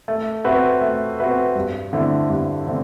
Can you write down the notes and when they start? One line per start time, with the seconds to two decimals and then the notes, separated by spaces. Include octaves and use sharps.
0.08 A3
0.44 C4 F#4 B4 E5
0.81 A3
1.18 C4 F#4 B4 E5
1.55 G2
1.93 D3 A3 C4 E4
2.29 G2
2.67 D3 A3 C4